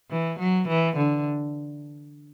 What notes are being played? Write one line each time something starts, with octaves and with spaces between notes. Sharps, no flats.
E3
F#3
E3
D3